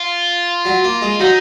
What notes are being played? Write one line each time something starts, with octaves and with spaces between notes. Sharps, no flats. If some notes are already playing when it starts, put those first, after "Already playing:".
Already playing: F4
F#3
A#3
G#3
F#3 D#4